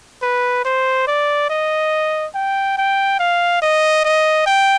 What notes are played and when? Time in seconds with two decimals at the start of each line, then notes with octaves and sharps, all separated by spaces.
0.22 B4
0.65 C5
1.07 D5
1.50 D#5
2.35 G5
2.77 G5
3.20 F5
3.62 D#5
4.04 D#5
4.46 G5